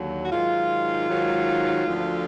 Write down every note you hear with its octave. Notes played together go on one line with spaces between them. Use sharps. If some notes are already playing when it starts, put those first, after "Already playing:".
Already playing: D#2 D3 F#3
F#4
G#2 D#3 F#3 F4
G#2 D#3 F#3
D2 D3 F3